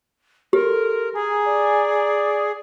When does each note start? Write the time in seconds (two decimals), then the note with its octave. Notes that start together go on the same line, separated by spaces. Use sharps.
0.53 G4 A4 A#4 C6
1.14 G#4 G#5 A#5
1.48 D5